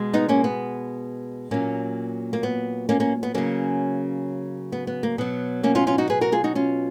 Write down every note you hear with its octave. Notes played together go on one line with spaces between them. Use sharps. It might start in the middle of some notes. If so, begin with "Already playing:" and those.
Already playing: B2 G#3
B3 D#4
A#3 C#4
B3
A#2 F#3 A#3 C#4
A#3
B3
A#3 C#4
A#3 C#4
B3
C#3 F#3 A#3 C#4
B3
B3
A#3
B2 F#3 B3
A#3 C#4
C#4 F4
C#4 F4
D#4 F#4
G#4 B4
F#4 A#4
F4 G#4
D#4 F#4
C#4 F4